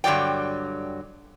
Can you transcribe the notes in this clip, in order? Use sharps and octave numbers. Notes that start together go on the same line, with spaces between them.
G2 D3 F#3 D5 G5